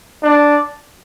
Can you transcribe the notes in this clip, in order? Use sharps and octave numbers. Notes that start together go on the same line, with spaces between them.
D4